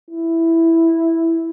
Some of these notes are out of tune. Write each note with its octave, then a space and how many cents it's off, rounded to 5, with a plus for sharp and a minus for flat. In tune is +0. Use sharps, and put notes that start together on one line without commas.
E4 +0